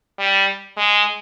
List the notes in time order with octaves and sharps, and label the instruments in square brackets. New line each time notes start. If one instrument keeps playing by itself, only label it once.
[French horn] G3
G#3